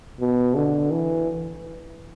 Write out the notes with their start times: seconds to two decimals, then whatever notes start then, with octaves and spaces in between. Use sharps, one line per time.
0.20 B2
0.56 D3
0.91 E3